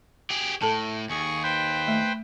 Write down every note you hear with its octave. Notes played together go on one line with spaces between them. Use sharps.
G4 G#4
A2 A4 A5
D#2 G#4 C#6
B4 C5 G5
A3